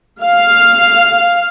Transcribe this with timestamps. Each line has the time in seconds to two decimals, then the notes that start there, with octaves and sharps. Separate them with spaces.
0.23 F5